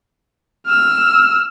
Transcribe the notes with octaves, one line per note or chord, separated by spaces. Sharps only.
E6 F6